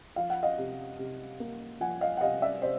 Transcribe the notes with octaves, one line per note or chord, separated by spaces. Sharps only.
F3 F5
F#5
D#5 F5
C3
C3
A#3
F3 F#5 G#5
D#5 F5
F#5
C3 D#5 F5
D5 E5
C3 C5 D5